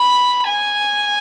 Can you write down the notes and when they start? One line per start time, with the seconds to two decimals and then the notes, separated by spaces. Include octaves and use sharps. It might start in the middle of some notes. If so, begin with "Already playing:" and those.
Already playing: B5
0.47 G#5